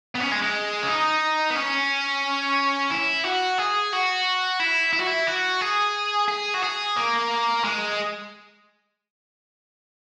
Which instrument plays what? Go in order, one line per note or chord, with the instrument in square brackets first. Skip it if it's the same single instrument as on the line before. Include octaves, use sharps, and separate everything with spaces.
[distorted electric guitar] B3
C#4
G#3
G#3
C#4
D#4
B3
C#4
E4
F#4
G#4
F#4
E4
E4
F#4
E4
F#4
G#4
G#4
F#4
G#4
A#3
G#3